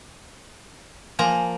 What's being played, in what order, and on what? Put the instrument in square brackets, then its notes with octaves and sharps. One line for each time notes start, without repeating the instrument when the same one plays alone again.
[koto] F3 A#3 A#5 [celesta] G#5